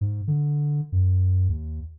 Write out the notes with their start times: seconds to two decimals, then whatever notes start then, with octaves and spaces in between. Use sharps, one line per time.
0.01 G#2
0.28 D3
0.92 F#2
1.49 D#2